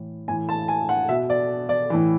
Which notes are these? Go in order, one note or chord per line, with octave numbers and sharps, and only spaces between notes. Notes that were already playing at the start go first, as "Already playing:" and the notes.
Already playing: A2 E3
A2 E3 G#5
A5
G#5
F#5
B2 E5
D5
D5
A2 E3